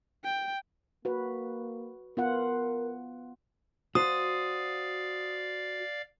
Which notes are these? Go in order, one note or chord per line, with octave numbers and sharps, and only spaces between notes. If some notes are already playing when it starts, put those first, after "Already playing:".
G5
A#3 F#4 B4
B3 F4 A#4 F#5
F#4 C5 D5 F5 D#6